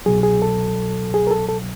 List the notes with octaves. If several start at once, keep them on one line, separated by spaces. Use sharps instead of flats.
C2 B2 F#3 G#4
G#4
A4
G#4
A#4
A4
A4